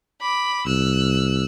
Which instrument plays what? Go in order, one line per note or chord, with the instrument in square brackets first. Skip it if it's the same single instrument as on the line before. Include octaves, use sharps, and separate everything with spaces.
[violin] B5 D6
[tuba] C2 [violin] E6 F#6